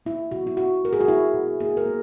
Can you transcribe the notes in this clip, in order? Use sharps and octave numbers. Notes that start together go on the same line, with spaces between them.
A#3 E4
B2 F#4
E4
C#4 F#4
A#3 A#4
G#4
F#4
B2 E4
B2
A#3 G#4
A#4
A#3